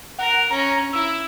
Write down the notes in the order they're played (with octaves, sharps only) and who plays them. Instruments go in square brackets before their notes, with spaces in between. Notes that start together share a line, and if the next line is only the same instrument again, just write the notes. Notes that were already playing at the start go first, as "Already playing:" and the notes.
[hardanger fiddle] A#4 [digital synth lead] F#5
[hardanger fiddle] C#4 [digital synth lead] A#5
[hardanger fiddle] E4 [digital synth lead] E6